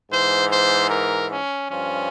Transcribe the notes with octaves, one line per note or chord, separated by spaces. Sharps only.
G#2 E3 C5
C5
A#4
C#4
G2 F3 C#4